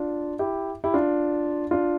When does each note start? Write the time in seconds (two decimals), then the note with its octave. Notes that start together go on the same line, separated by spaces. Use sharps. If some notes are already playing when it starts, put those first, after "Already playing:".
Already playing: D4 F4
0.39 E4 G4
0.84 E4 G4
0.94 D4 F4
1.71 D4 F4